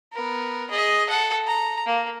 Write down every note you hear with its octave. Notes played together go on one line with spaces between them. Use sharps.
B3 A#4
G#4 D#5
A4 F#5
A#5
A#3